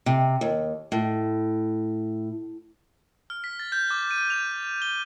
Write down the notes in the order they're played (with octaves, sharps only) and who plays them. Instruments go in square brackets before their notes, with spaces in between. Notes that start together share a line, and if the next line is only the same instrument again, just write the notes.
[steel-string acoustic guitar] C3
D#2
A2
[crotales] F6
B6
A6
G6
D6
D#7
F7
G7